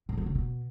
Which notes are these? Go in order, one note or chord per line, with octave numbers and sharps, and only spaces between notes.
A2
F#3
C#3
B2